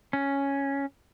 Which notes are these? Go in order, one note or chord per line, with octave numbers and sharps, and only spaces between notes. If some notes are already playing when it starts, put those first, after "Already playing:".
C#4